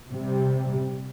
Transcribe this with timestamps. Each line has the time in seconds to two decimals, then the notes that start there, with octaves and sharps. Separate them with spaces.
0.13 C3 G3